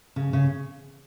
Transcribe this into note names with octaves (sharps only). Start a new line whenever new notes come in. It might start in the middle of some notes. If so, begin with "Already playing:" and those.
C#3
C#3